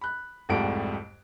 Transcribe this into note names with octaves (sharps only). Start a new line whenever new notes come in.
B5 F#6
C2 F2 G#2 G3 A3 D7